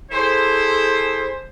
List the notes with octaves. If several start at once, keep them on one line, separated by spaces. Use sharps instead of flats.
E4 G#4 A4 C5